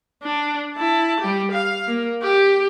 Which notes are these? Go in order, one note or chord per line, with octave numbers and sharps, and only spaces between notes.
D4
E4 A5
G3 G4
F5
A#3
G4